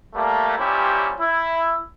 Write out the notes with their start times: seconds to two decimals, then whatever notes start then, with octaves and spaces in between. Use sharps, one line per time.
0.14 G3 A3 A#3
0.58 A#2 G3 C#4 E4 G4 C5
1.19 E4